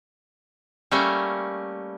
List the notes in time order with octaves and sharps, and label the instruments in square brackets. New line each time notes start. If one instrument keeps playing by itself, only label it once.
[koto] G3 A3 A#3 C#4